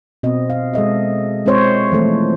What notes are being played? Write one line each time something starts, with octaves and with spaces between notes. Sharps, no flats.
B2 C4 D#5
F5
G#3 A4 D#5 E5
G#3 C4 F4 C5 C#5
E3 F3 A3 A#3